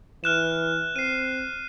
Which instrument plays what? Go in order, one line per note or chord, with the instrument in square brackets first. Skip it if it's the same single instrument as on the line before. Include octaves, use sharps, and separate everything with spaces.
[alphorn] E3 [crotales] F6 F#6 E7
[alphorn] C4 [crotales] C7 D#7